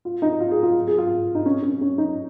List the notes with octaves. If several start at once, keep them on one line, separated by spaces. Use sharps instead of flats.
F4
D#4
F4
G#4
F4
G#4
F4
D#4
C#4
C#4
C#4
D#4